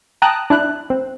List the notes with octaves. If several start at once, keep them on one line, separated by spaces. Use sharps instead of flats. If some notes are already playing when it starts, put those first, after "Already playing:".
G5 A5 A#5 D#6 F#6
D4 E4 F#6
C4